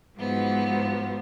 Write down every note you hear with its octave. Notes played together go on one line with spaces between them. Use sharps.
G#2 F3 F#3 B3